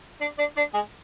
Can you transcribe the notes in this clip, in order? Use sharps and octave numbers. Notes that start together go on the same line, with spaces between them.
D4 D5
D4 D5
D4 D5
G#3 G#4